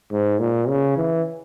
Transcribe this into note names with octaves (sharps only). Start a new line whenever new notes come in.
G#2
A#2
C#3
E3